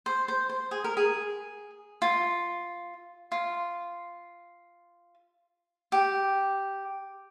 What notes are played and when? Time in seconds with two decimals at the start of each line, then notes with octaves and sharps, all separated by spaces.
0.06 C5
0.28 C5
0.49 C5
0.71 G#4
0.84 A#4
0.97 G#4
2.02 F4
3.32 F4
5.92 G4